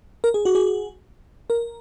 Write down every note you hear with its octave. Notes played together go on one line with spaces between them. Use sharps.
A#4
G#4
F#4
G#4
A#4